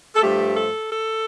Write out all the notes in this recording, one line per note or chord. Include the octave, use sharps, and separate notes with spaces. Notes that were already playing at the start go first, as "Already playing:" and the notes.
A4
G2 F3 A3 G4
A4
A4